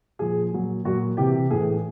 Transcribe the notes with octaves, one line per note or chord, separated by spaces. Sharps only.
A#2 F3 G#4
A#2 F#3
A#2 F#3 F#4
C3 E3 G4
A2 E3 G#4